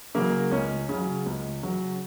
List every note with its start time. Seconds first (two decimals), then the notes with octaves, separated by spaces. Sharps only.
0.15 C#3 F#3 A#3
0.51 C#2 C#4
0.89 C#3 F#3
1.26 C#2
1.63 C#3 F#3